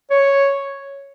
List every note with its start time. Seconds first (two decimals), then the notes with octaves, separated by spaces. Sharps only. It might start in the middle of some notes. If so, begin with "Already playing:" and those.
0.10 C#5